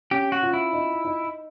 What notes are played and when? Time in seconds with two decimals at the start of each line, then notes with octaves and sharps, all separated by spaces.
0.11 C#4 G4
0.32 F#4
0.43 F4
0.53 E4
0.73 D#4
1.05 D#4